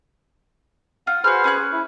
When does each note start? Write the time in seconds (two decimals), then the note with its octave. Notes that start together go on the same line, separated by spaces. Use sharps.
1.07 F4 F#5
1.24 F#4 G#4 B4 C5 F6
1.44 C#4 B5 F#6
1.72 E4